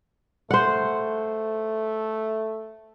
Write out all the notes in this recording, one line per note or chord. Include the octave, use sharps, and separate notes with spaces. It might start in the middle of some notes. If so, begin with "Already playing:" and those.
A3 C5 F#5